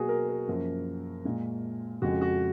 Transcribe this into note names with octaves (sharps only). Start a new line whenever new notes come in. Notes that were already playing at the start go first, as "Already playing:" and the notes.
Already playing: B2 F#3 A#3 F#4 G#4
A#4
A#4
F#2 F3 A#3
A#2 G#3
F2 C#3 G#3 F#4
F#4